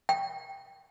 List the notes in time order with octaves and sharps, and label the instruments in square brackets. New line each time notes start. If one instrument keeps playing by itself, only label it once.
[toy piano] G5